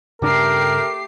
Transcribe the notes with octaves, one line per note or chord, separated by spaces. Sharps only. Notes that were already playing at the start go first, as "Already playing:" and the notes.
G2 C#3 A3 D4 G4 A#4 D6 C7